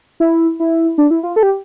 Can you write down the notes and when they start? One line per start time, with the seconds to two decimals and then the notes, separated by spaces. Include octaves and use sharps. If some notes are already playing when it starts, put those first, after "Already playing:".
0.20 E4
0.60 E4
0.98 D4
1.11 E4
1.23 F4
1.36 A4
1.43 G4